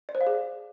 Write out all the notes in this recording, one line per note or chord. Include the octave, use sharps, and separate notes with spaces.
D5
C5
F5
G#4